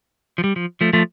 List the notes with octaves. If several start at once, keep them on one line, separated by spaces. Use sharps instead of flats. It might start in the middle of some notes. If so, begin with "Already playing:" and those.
F3
G3
F3
F3 A3
F3 A3